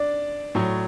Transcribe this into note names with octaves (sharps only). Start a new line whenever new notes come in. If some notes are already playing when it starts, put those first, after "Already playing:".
Already playing: D4 D5
A2 F#3